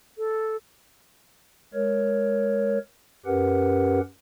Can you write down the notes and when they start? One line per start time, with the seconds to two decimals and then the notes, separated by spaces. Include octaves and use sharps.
0.18 A4
1.74 G#3 A#4 C#5
3.26 F#2 C#4 G4 A#4 B4 F#5